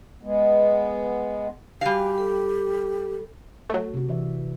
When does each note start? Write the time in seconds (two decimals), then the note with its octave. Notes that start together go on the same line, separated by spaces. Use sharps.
0.23 G#3 B3
1.81 G3 F#4 G4 D5 F5 G#5
2.18 A4
3.70 F#3 A3
3.94 C3 F#4
4.09 E3 D5 E5